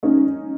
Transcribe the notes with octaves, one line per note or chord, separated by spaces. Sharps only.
C#4 D#4